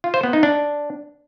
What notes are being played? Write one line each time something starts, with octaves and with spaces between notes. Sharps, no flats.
F4
C5
B3
D#4
D4